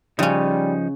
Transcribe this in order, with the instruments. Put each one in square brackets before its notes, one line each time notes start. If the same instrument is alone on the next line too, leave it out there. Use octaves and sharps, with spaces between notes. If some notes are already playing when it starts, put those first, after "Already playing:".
[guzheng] C#3 C#4 [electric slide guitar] F3 D#4 [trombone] G3